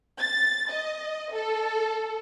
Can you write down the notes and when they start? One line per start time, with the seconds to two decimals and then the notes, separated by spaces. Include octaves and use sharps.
0.19 A6
0.70 D#5
1.33 A4